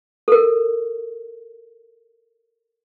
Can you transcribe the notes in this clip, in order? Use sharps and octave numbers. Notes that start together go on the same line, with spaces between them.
A4 A#4